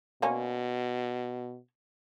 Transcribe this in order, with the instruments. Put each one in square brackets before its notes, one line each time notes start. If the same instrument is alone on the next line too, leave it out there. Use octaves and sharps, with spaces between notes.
[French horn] B2 [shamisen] D3 A#3 C#4